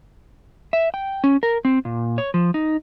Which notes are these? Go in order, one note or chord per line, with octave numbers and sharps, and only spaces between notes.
E5
G5
C#4
A#4
C4
A#2
C#5
F3
D#4